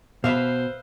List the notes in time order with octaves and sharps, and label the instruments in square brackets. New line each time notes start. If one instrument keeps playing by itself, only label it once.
[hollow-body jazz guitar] B2 [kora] B4 E5 F5 [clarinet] C5